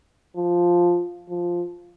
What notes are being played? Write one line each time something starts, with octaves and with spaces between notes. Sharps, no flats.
F3
F3